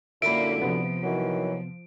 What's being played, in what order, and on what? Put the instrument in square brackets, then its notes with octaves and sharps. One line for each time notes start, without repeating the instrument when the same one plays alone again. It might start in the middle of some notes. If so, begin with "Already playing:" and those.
[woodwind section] F#2 A#2 D3 [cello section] A#3 E4 [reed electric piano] E5 B5 [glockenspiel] D7
[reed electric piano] C3 B3 [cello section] F3
[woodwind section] D#3 E3 F#3